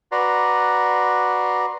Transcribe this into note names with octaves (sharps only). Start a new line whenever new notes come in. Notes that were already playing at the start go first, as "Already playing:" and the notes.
F#4 B4 D5 A#5 C6